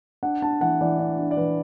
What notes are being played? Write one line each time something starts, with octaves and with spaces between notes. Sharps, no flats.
D4 F#5
D4 A5
E3 F#5
E3 D5
D4 D5
D4
D5
E3 B4